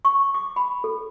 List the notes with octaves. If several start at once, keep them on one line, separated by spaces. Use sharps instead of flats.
C#6
D6
B5
A4